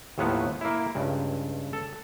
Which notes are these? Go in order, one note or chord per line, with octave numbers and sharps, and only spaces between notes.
D#2 A2 F3 F#3 B3 F#5
A#3 E4
C#2 G2
A4